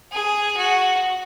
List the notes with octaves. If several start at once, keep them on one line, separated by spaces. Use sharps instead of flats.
G#4
F#4